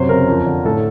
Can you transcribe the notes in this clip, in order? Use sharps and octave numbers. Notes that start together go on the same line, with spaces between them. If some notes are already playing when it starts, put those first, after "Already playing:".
Already playing: F#2 C3 C5
C#3 A#4
F2
D3
A2 A4